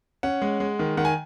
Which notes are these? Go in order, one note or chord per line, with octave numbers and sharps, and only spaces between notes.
C#4 F#5
G#3
G#3
D#3
D#3 F#5
G#5